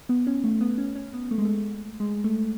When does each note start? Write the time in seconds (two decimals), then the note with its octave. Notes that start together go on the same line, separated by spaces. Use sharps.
0.09 B3
0.27 C#4
0.44 A3
0.61 B3
0.78 C#4
0.95 C#4
1.13 B3
1.31 A3
1.38 G#3
1.45 A3
2.00 G#3
2.24 A3